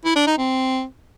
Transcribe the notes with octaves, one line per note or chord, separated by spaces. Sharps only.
E4
D4
D#4
C4